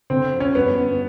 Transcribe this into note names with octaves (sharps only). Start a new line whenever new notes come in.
D3 C4
F2
C#4
G2 B3
G2